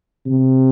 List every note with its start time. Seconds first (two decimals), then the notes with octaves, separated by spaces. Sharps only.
0.26 C3